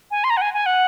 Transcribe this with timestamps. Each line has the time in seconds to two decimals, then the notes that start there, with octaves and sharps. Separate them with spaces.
0.11 G#5
0.24 C6
0.30 A#5
0.37 F#5
0.41 G#5
0.54 G#5
0.66 F#5